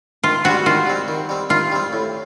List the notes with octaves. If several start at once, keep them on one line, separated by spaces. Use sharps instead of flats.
D#3 F4
G3 C4 F#4
D#3 F4
G3 C4
D#3
G3 C4
D#3 F4
G3 C4
A2